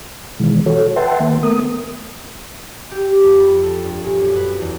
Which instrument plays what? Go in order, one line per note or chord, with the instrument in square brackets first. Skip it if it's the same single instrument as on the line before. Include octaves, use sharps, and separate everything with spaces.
[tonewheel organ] B2 D#3 E3 G#3
F#4 A4 C#5
B4 E5 F#5 G5 A5 C6
D#3 A#3
A3 B3 A#4 D#6
[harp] G4
F2
B5
A4
G2
A#2
F#2
B4
E2